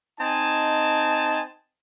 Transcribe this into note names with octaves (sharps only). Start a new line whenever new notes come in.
C4 D#4 D#5 G#5 A5